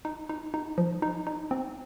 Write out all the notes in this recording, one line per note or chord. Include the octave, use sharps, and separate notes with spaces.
D#4
D#4
D#4
F3
D#4
D#4
C4